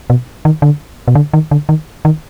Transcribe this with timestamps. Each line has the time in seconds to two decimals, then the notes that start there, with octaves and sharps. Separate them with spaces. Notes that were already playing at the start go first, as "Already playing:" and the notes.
0.10 B2
0.45 D#3
0.62 D3
1.08 B2
1.15 D3
1.33 D#3
1.51 D3
1.69 D#3
2.05 D#3